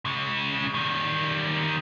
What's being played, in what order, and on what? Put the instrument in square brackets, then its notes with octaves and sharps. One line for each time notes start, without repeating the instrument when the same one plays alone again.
[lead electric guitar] C#3 G#3
D#3 G3